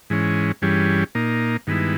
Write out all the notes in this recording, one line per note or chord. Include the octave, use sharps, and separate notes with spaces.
G#2 E3 G#3 C#4
G2 E3 G3 C#4 G#4
A#2 A#3 D#4
G2 D#3 G#3 B3 E4